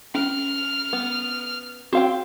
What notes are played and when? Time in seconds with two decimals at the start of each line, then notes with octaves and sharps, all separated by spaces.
0.15 C#4 F6
0.93 B3
1.93 C4 F#4 F5 G5